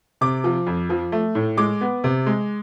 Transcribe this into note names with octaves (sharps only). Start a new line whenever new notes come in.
C3 D6
F3
F2
F3
A3
A2
G#3 D6
B3
C3
G#3